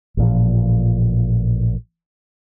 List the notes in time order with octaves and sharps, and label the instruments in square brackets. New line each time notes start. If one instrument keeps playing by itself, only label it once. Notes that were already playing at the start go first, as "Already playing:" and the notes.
[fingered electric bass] A1 A#2 F3